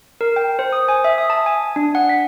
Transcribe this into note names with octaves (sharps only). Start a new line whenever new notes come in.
A#4
G5
C5
D#6
G#5
E5
D#6
A5
G#5
D4
F#5
B6